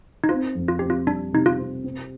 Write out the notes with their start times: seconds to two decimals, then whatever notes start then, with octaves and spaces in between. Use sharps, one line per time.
0.24 D#4
0.29 C4 F4
0.55 F2
0.68 F4
0.79 C4 G4
0.90 F4
1.07 G3 D4
1.33 C3 D#4
1.46 F4
1.58 C4
1.84 C4